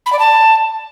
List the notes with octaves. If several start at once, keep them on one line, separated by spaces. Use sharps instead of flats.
B5
D5
A5